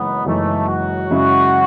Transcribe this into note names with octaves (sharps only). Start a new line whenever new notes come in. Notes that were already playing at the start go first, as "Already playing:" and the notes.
Already playing: F#1 F#2 E3 G#3 B3 D#4
F#1 F#2 E3 G#3 A3 D#4
F#4
F#2 C#3 G#3 C#4 E4